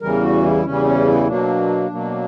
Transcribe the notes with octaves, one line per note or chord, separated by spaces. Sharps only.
E2 C#3 E3 G3 A#4
F#4
E4
E2 C#3 E3 G3 C#4
C#4
E4
B2 F#3 A#3 D4
B2 F#3 A#3